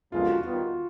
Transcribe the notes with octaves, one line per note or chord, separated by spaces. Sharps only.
F#2 D3 F3 G#3 B3 F4
F#4
F4
D#3 G3 B3